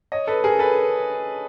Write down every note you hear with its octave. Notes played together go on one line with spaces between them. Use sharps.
C#5 D#5
A4 B4
G#4 A#4
A4 B4